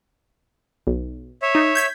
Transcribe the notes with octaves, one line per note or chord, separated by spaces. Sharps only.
B1
C#5 E5
D#4
G6 G#6 B6